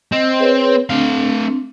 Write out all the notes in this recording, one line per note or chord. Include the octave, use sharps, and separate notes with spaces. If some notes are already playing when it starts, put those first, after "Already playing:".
C4 D#5
G#4 B4 C#5
A3 C4 D4 F5